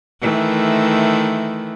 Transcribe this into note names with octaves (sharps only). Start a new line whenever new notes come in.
D#3 E3 A3